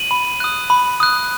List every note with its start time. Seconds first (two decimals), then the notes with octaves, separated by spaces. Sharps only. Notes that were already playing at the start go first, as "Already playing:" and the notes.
Already playing: D#7 F#7
0.11 B5
0.40 D#6 F#6
0.70 B5
1.00 D#6 F#6